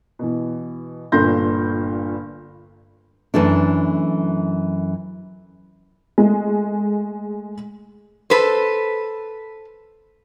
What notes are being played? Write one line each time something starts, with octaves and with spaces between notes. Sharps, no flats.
B2 E3
G1 G2 A#2 C6 G6 A#6
F#2 E3 A3 D4
G#3 A3
A4 B4 C5